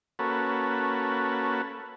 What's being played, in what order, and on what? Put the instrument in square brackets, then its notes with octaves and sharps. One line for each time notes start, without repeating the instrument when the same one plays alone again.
[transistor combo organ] A#3 C#4 F#4 A4 B4